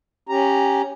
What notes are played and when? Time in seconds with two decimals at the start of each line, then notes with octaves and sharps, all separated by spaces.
0.29 C#4 G4 A#5